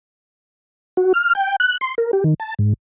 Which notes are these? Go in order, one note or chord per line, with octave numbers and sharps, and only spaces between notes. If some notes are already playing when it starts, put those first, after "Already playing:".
F#4
F6
G5
F#6
C6
A#4
G4
D#3
A5
G#2